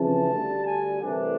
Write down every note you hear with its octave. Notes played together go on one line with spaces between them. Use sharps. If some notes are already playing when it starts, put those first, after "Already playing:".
Already playing: F2 C#3 E3 A5
D2 D3 G3
G#5
C2 C3 E3 A3 D4